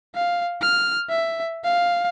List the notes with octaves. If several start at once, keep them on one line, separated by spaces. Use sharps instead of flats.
F5
F6
E5
F5